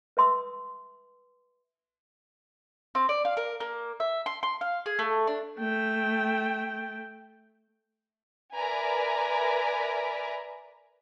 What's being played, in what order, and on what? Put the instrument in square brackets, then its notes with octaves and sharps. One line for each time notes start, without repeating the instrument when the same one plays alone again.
[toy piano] B4 E5 C6 D#6 E6
[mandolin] C4
D5
F5
A#4
A#3
E5
C6
C6
F5
G#4
A3
D4
[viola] A3 G5
[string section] A#4 B4 D5 E5 G#5 A#5